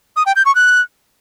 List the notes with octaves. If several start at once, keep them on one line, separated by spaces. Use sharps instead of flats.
D#6
G5
G6
C#6
F#6